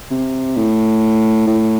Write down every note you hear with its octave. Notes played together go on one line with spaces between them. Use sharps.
C3
A2
A2